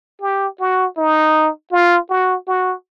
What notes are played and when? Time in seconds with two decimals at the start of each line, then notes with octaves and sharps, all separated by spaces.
0.21 G4
0.60 F#4
0.97 D#4
1.72 F4
2.10 F#4
2.47 F#4